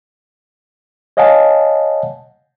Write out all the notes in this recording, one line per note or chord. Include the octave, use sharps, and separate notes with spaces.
C#5 D#5 F5 F#5 G#5 A5